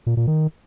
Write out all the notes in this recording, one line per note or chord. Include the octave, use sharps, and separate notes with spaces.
A#2
A#2
D#3